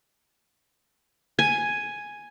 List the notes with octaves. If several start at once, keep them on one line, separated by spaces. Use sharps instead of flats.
G#5